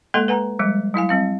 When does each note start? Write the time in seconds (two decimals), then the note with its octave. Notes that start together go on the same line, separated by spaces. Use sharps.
0.14 G#3 A#3 A4 D#5 F#5 C6
0.28 B4 F#5 G#5 A#5
0.59 F3 G3 G#3
0.94 F#3 E4 F5 G#5
1.09 G3 C4 F5